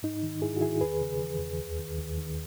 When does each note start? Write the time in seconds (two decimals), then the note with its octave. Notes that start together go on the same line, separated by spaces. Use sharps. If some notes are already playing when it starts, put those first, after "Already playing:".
0.03 G#2 D#4
0.23 D#3
0.42 G#2 E4 G#4
0.56 F#4
0.61 D#3 E4 G#4
0.81 E2 G#4 B4
1.01 C#3
1.20 E3
1.39 E2
1.59 D#2
1.79 D#3
1.98 D#2
2.17 D#3